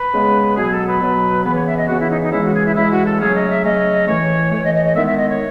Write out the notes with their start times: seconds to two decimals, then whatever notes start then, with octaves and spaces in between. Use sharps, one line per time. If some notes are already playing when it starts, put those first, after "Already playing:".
Already playing: B4
0.13 C#3 G#3 B3
0.56 B2 F#3 B3 G#4
0.71 A4
0.86 B4
1.01 B2 F#3 B3
1.44 C#3 E3 B3 B4
1.55 C#5
1.67 E5
1.77 D#5
1.88 C#3 E3 B3 F#4
1.99 E4
2.10 D#4
2.21 D#4
2.32 C#3 E3 G#3 E4
2.43 F#4
2.54 G#4
2.65 E4
2.75 C#3 E3 G#3 E4
2.91 F#4
3.06 A4
3.20 C#3 F#3 A3 C#4 G#4
3.35 D#5
3.49 E5
3.63 C#3 F#3 A3 C#4 D#5
4.08 A2 E3 A3 C#5
4.52 A2 E3 A3 C#5
4.63 D#5
4.73 D#5
4.84 D#5
4.95 D#3 G#3 B3 E5
5.07 E5
5.17 D#5
5.29 C#5